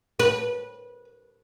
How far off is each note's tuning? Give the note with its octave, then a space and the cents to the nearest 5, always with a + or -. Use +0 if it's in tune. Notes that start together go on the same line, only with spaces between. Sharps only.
B4 -25